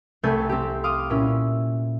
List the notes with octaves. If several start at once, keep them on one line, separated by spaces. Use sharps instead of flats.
C2 A3 C4 G#5 G6 A6
C4 G4
F5 C6 D6 D#6 F6
A#2 C#4 E4